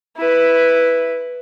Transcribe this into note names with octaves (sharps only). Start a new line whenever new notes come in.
E4 B4